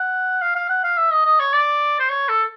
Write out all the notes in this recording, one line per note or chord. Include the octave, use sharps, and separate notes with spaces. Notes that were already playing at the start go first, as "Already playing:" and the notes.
Already playing: F#5
F5
F5
F#5
F5
E5
D#5
D#5
C#5
D5
C5
C#5
A4